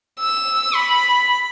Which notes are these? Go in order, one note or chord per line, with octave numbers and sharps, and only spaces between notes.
E6
B5